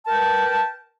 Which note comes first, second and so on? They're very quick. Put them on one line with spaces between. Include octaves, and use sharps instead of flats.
A5 A#4 G5 B4